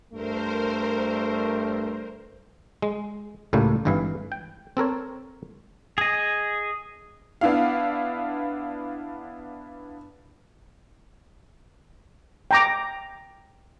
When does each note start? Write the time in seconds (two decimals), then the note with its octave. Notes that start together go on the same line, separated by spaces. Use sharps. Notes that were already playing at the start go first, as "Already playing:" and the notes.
0.13 G2 A3 A#4 C5
2.82 G#3
3.53 C#2 A2 G3 A3 A#3
3.85 G#1 G2 E3 E4 F5
4.32 G5
4.77 C4 A4 A#4 C#5
5.98 G#4 D#5
7.41 B3 D4 E4 F5
12.51 G5 A#5 D6